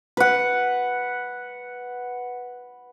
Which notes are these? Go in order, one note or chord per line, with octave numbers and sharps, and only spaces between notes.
B4 F#5